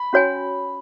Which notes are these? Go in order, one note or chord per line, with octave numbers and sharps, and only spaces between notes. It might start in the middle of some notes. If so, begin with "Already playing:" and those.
Already playing: B5
C#4 F#4 C#5 G#5